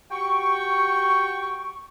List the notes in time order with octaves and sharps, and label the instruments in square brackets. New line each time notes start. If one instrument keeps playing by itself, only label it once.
[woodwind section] F#4 G4 G5 C#6